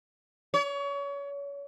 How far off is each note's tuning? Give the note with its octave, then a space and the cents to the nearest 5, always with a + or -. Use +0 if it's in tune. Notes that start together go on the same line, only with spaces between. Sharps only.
C#5 +30